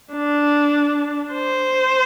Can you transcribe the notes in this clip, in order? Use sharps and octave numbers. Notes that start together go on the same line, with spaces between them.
D4
C5